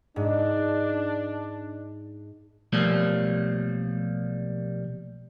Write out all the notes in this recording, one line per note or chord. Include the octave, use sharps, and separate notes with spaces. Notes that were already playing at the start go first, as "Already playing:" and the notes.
G#2 D4
B1 F3 G3 A3 A#3